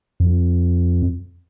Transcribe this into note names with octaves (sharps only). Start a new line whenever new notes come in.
F2